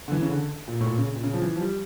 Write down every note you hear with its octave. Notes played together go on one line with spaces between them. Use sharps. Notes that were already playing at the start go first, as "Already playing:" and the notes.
D3
E3
C#3
D3
A#2
A2
A#2
C#3
A#2
C#3
F3
E3
F3
G3